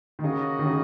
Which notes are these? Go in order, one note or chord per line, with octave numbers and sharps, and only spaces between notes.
D#3
C#3 A#3 F#4 D#5
D#3
C#3